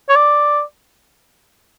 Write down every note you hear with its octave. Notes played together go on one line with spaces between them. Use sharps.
C#5
D5